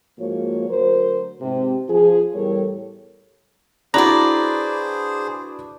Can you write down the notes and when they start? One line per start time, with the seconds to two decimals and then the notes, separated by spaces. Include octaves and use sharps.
0.19 G#2 F3 A#3 F#4 C#5
0.69 D2 F#3 A#4 C5
1.42 G#2 C3 C4
1.89 F3 G#4
2.34 E2 A2 G3 A4 A#4 C#5
3.94 D4 E4 F#4 G#4 B4 C5 D5 A#5